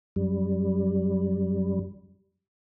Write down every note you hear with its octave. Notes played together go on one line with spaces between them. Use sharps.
F#2 G3